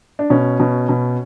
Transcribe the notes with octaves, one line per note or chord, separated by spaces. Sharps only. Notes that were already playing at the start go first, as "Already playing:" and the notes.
D4
B2 C#4
B2
B2